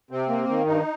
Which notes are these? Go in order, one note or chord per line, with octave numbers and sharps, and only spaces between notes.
C3 C4
A#3
D#3
G2 D#4